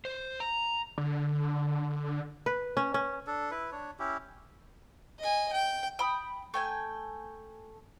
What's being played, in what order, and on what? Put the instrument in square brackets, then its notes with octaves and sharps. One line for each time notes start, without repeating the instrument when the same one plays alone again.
[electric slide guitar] C5
A#5
[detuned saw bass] D3
[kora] B4
C#4
C#4
[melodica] D4 A4
E4 B4
D4 C#5
C#4 E4 G4
[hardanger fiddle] D#5 G#5
G5
[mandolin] G5 B5 D#6
A3 G5 G#5